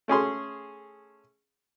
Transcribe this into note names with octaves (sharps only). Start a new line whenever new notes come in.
A3 C#4 G#4 C6